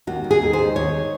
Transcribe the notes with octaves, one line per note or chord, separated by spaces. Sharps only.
D#2 F#4
D#2
G#4
D#2
C5
D#3
D#2 C#5